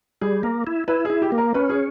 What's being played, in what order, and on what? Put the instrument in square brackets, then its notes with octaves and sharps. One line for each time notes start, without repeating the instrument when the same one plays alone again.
[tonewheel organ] G3 [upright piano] G#4
[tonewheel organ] A#3 [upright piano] A#4
[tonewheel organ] E4
[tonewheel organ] E4 [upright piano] B4
[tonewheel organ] E4 [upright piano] G#4
[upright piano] G4
[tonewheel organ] A#3
[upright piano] A#4
[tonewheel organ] C#4 [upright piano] B4
[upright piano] G#4